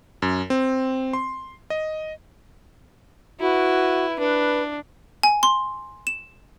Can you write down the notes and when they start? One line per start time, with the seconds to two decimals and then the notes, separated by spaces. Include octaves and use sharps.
0.22 F#2
0.50 C4
1.13 C6
1.70 D#5
3.40 E4 F#4 B4
4.19 D4 B4
5.23 G#5
5.43 C6
6.07 E7